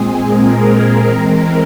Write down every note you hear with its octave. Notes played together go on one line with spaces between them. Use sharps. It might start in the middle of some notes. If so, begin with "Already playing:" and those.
Already playing: A#2 G#3 C4 G#4
A#4
E3 G#3 C4